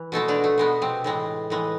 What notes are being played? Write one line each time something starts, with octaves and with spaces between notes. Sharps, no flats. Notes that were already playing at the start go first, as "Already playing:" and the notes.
Already playing: E3
B2 G#3 A3 A4
D3 D4
A3
B2 G#3 B3
C3 C4
A2 E3 G#3
A2 E3 G#3